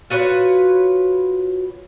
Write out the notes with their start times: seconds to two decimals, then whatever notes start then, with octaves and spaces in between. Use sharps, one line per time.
0.10 F4 F#4 B4 C#5